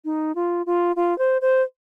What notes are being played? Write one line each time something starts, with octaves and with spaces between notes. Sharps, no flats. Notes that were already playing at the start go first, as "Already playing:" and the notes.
D#4
F4
F4
F4
C5
C5